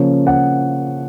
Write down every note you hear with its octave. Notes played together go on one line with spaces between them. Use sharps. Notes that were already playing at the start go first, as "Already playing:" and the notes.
Already playing: C#3 F3 A#3 C#4
F#5